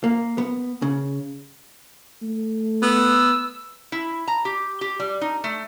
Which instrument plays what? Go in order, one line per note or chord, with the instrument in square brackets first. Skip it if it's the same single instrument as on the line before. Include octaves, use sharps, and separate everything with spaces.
[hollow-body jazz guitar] A#3
B3
C#3
[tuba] A3
[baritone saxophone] B3 [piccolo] E6
[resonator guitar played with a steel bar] E4
A#5
G4
G4
G3
D#4
A3